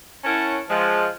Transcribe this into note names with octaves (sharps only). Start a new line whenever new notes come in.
C#4 E4 A#4 C#5 F#5 A5
F3 G#3 A5